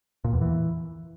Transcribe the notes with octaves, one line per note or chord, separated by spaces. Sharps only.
A#2
E2
E3